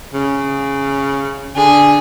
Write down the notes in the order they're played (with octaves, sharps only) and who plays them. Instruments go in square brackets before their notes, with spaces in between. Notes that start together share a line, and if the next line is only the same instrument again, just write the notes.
[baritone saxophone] C#3
[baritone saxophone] D3 [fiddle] G#4